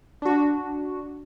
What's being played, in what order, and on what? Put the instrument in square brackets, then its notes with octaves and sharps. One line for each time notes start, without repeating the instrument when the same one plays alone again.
[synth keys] D4 F#4